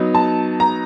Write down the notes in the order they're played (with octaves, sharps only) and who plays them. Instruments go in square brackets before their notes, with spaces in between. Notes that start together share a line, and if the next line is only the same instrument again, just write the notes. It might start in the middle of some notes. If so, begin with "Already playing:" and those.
Already playing: [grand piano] F#3 B3 D#4
[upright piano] A5
A#5